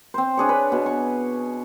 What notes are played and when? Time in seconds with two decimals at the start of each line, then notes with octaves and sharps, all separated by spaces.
0.14 C4 C5
0.38 D4 G#4 C#5
0.49 B4
0.72 B2
0.86 C#6